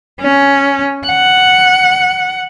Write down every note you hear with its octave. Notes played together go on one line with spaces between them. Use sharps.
C#4
F#5